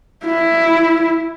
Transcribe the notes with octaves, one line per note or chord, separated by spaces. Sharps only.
E4